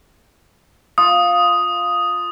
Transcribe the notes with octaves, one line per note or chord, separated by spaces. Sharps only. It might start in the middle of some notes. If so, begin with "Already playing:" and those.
F4 D#6